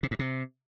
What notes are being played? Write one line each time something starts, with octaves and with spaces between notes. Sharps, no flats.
C3
G#2
C3